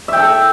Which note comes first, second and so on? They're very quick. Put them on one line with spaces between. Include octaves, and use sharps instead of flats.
E5 G5 A4